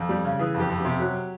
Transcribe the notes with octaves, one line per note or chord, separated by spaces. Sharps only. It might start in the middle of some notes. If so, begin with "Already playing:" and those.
Already playing: F2
G3
C#3
E3 G#4
F2
G4
F2
C3 G4
F#3